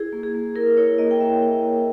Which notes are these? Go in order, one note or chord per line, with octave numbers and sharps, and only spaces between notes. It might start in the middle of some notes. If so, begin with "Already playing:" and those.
Already playing: E4 G#4
A#3
G#4
A#3
E4 A#4
E4 C#5
A#3 D#5
G5
A#3 E5
E4
E4